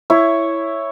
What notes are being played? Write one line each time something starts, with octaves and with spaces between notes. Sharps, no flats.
E4 C#5